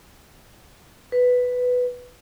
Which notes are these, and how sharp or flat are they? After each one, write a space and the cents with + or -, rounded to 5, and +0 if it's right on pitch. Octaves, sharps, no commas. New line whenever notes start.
B4 +5